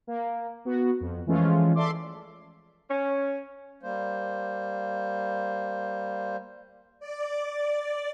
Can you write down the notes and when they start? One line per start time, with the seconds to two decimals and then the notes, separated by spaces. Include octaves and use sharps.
0.07 A#3
0.65 B3 F#4
1.00 F2
1.26 E3 F3 G#3 A3 C#4 F4
1.75 A4 D5 E5 C6 D6
2.90 C#4
3.83 G3 A#3 C5
7.00 D5